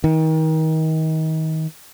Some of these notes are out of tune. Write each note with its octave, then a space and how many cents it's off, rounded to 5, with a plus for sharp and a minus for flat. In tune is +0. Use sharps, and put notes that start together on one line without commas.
D#3 +30